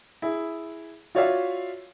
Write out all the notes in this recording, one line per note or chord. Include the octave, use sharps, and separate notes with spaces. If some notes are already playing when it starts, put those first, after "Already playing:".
E4 G#4
F4 F#4 C#5 D5 E5 F5